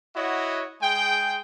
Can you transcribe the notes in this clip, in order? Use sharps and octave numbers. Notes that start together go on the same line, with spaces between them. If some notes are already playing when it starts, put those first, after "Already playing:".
E4 F#4 C#5 D#5 F#5
G#3 G#4 G5